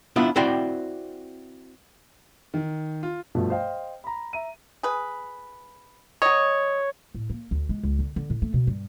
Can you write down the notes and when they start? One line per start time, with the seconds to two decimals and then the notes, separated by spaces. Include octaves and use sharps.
0.16 B3 D4 E4 F4
0.36 C4 E4 F#4 C5 D5 G5
2.54 D#3
3.03 F4
3.35 G2 B2 F3 A3
3.50 C5 D#5 F5 G5
4.04 A#5 B5
4.33 E5 A#5 D#7
4.83 G#4 B4
6.22 F#3 C#5 D#5
7.15 A2
7.30 A#3
7.51 D2
7.69 G#3
7.84 C#2
7.99 D3
8.16 D3
8.30 A2
8.42 A3
8.54 B2
8.67 G2